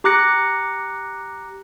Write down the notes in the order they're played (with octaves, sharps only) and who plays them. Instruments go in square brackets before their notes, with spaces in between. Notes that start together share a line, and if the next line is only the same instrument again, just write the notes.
[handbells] G4 A#5 D6 F#6 A#6 C#7